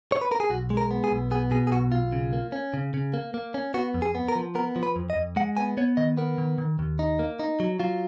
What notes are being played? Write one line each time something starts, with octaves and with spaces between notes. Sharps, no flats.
C#5
B4
A#4
G#4
B1 F#4
G#3
A#4
B3
G#4
B1
B3 G#4
B2 G#4
G#4
B1 F#4
B1 F4
C#3
A#3
C#4
C#3
C#3
A#3
A#3
C#4
B3 F#4
F2
G#4
B3
A#4
F3
B3 A#4
F3
B4
F2
D#5
F2
G#3 F#5
B3 G#5
B3 C#5
D#3 D#5
B3 A#4
D#3
D#3
D#2
D#4
A#3
D#4
F#3
F#3 F4